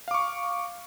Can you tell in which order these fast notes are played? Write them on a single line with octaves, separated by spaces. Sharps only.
F5 D6 C#6